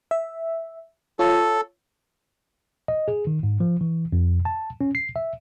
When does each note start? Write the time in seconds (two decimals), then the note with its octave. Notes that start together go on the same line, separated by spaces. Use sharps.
0.11 E5
1.19 F4 A4 C#5
2.88 D#5
3.08 G#4
3.27 D#3
3.43 G#2
3.60 F3
3.81 E3
4.12 F2
4.45 A5
4.81 C#4
4.95 C7
5.16 E5